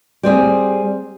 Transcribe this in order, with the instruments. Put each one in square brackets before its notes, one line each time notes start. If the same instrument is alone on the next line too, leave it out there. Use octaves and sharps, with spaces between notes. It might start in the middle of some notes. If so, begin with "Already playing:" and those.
[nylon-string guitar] G3 C4 G#4